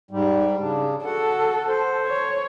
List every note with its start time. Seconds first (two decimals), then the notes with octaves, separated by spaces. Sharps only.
0.11 G#2 G3
0.59 C#3 D4
1.05 F#4 A4 F#5
1.68 C5
2.07 C#5